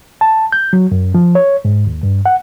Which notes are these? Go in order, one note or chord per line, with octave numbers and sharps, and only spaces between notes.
A5
G6
F#3
F#2
F3
C#5
G#2
D#2
G2
F#5